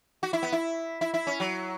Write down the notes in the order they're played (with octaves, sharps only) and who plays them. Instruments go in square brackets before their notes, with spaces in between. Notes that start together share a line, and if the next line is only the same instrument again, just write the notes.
[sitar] F#4
E4
B3
E4
E4
E4
C#4
F#3